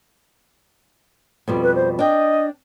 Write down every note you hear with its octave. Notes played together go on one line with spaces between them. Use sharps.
F2 B2 G3
B4
C5
D4 D#5 G5